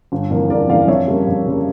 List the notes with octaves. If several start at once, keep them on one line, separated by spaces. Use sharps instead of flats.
G1
F2 E3 A#3
G1 A#4 D5
F2 E3 A#3 D5 F5
F2 C#5 E5
C#3 G3 A#3
F2
C#3 G3 A#3